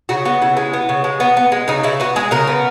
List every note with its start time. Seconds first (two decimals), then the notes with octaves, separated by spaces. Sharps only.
0.09 C#3 F#4
0.25 B3 F#4
0.42 C#3 E4
0.57 G#3
0.73 B3
0.89 C#3
1.04 G#3
1.20 B3
1.37 B3
1.52 G#3
1.68 C#3 D#4
1.83 C#3 E4
2.00 B3 F#4
2.16 G#3 G#4
2.31 C#3 A#4
2.47 B3